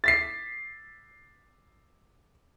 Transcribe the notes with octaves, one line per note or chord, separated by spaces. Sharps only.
A6 B6 C7